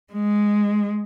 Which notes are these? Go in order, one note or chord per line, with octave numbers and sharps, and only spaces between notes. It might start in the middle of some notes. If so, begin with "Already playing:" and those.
G#3